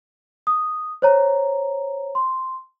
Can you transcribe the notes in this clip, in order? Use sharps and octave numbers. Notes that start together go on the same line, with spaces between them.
D#6
C5 C#5 A#5
C6